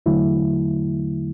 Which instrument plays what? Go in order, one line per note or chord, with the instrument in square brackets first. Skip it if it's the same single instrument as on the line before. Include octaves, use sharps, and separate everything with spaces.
[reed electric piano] E2 D3 F#3 A3 E4